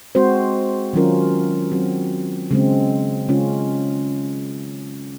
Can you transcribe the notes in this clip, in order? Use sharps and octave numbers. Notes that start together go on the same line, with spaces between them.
G#3 C4 F#4 C5
D#3 F#3 C#4 F4 A#4
F#3 C4 F#4
C#3 G#3 C4
C#3 G#3 C#4 F4